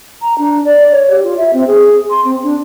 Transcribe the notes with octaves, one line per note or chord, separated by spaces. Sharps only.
A#5
D4
D5
C#5
G4
F4
E5
C4
G#4
C6
C4
D4